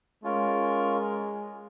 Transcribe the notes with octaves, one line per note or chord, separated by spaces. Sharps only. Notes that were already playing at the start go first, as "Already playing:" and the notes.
G#3 C#4 F4 A#4